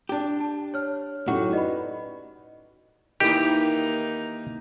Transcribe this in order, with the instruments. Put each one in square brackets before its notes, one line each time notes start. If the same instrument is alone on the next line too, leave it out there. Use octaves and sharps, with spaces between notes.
[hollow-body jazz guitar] D4 G4
[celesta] A5
C#5 F6
[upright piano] F#2 A2 G4 [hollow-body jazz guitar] D#4 F#4 [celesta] F#5
[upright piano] B4 D5 [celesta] D#5 B5
[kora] D#3 E3 [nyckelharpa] A#3 D#4 [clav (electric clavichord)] G4